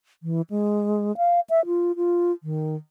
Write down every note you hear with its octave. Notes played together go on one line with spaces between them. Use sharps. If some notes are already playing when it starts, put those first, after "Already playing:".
E3
G#3
F5
E5
F4
F4
D#3